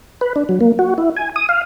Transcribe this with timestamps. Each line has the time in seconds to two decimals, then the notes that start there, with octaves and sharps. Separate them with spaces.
0.21 B4
0.36 D4
0.49 F#3
0.61 A#3
0.79 F#4
0.98 E4
1.17 G#5
1.36 D#6
1.49 F5